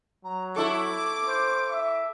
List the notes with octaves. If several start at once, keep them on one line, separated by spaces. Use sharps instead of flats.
F#3 A#5
E4 A4 C#6 D6
C5
E5